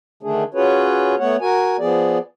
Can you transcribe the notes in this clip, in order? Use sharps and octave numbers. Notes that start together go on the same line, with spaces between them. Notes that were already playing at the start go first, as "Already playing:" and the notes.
D3 D#3 A3 D4 G#4
C#4 F4 F#4 G#4 B4 C#5
A3 B3 C#5 F#5
F#4 A#4 G#5
F3 B3 G#4 D5